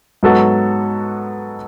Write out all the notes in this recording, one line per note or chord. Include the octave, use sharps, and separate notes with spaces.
G#2 F#3 B3 F#4 A4